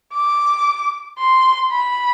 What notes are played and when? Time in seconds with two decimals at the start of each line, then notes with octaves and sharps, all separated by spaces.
0.14 D6
1.19 C6
1.71 B5